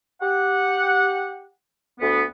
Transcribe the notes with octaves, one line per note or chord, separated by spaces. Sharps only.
G4 F#5
D2 B3